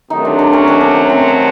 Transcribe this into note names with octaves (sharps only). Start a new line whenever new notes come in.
C3 D#3 F#3 A3 D#4
D4
D4
C#4
D4
D4
C#4
C4